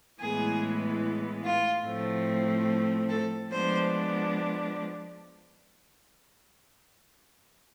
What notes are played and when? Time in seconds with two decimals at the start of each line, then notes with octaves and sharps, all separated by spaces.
0.20 A2 E3 G#3 B3 G#4
1.44 F4
1.86 A2 F3 A3 C4
3.09 A4
3.50 F3 G#3 B3 D4 C5